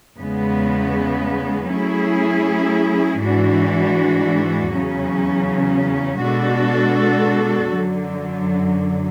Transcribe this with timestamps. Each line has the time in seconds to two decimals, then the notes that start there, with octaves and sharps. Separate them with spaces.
0.20 E2 C#3 G#3 B3
1.70 F#3 A3 C#4 E4 G#4
3.21 G#2 E3 G#3 D4 F#4
4.71 E2 C#3 F#3 C#4
6.23 B2 G#3 D4 F#4 A4
7.73 F#2 D3 F#3